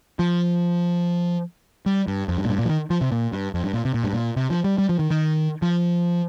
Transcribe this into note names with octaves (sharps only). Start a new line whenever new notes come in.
F3
G3
G2
F2
G2
A#2
G2
A#2
F3
D#3
F3
C3
A#2
G2
F2
G2
A#2
C3
A#2
G2
A#2
C3
F3
G3
G3
F3
D#3
D#3
F3